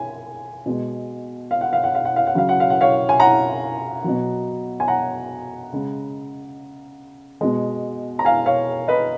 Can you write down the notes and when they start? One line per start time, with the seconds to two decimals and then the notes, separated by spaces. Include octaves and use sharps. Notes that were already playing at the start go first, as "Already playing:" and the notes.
Already playing: G#5
0.66 B2 G#3
1.51 F5
1.61 F#5
1.73 F5
1.84 F#5
1.95 F5
2.05 F#5
2.16 F5
2.27 F#5
2.35 C#3 F#3 F5
2.49 F#5
2.60 F5
2.70 F#5
2.81 C#5 F5
3.09 G#5
3.20 F#5 A#5
4.04 B2 F#3
4.80 G#5
4.88 F#5 A#5
5.73 C#3 G#3
7.41 B2 G#3
8.19 A#5
8.25 F5 G#5
8.46 C#5 F5
8.88 B4 D#5